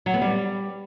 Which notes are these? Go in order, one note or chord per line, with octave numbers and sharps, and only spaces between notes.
F#3
B3
G3